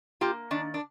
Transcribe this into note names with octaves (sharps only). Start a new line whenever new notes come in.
A#3 F4 G4
D#3 D4
D4